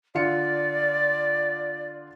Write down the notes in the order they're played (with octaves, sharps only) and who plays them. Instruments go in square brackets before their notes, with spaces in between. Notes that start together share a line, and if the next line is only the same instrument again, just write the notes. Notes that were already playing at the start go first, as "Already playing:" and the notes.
[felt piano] D3 F4 C#7 [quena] D5